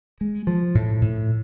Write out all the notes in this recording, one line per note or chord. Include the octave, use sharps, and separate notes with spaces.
G#3
F3
A2
A2